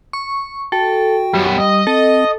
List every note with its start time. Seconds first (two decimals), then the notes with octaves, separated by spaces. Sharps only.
0.13 C#6
0.72 F#4 A4 G5
1.34 F#2 G3 B3
1.58 D#5
1.87 C4 A4